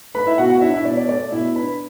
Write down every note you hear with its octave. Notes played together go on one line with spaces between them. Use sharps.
A3 B4 B5
E4 E5
B2 F#4 F#5
F#4 F#5
D4 E4 E5
E4 E5
B2 D5
D5
A3 D5
B2 E4 E5
D4 B4 B5